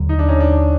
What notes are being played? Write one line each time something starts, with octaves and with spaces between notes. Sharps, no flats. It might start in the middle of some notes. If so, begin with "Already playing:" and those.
Already playing: D#2 D3 F#3
D#4
D4
C#4 D#4
D4